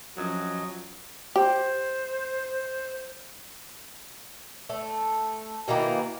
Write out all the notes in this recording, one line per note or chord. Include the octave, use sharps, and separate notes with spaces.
F3 F#3 C#4 D#5
G4 C5
A3
B2 D#3 E3 A#3